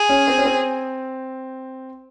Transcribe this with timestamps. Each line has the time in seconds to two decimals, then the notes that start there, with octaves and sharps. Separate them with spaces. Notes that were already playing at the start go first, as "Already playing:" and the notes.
Already playing: G#4
0.09 C#4
0.28 C4
0.38 C#4
0.45 C4